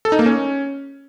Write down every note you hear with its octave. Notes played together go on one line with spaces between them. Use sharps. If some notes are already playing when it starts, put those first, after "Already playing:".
A4
D#4
A#3
C#4